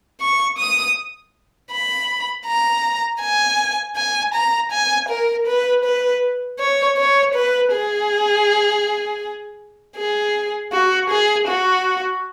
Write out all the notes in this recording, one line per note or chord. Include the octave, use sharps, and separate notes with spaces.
C#6
D#6
B5
A#5
G#5
G#5
A#5
G#5
A#4
B4
B4
C#5
C#5
B4
G#4
G#4
F#4
G#4
F#4